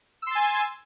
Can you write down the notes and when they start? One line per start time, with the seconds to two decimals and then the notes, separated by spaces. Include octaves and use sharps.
0.22 E6
0.26 C6
0.31 A6
0.35 G#5